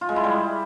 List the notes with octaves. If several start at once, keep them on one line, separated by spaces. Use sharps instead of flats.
F4
G#3
E4
G3